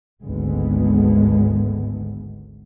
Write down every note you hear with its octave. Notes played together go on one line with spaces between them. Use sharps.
G#1 D2 G#3 A3 B3